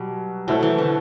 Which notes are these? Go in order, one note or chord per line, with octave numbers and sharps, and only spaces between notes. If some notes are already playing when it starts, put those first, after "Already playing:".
Already playing: B2 F#3 G3
B2 F#3 A3 E4 A4 C5
E3
D3